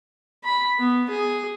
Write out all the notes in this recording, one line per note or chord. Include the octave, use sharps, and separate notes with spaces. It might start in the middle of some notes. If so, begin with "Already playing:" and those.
B5
B3
G#4